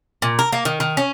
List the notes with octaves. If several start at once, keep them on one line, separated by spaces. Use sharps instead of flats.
A#2
A#4
A#3
D#3
D#3
C#4